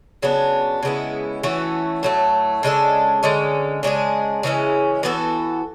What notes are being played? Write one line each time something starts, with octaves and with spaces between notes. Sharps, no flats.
C#3 F#3 B3 D4
C#3 G#3 B3 E4
E3 A3 C#4 F#4
A2 F#3 A3
C#3 G#3 D4 A4
D3 G#3 C#4
C#3 G#3 D4 G#4
C#3 E3 G#3 C#4
E3 B3 F#4 A4